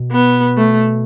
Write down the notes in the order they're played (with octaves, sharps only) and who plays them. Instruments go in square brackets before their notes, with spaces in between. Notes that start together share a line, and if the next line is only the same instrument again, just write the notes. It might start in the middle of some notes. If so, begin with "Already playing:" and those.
Already playing: [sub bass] B2
[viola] B3
A3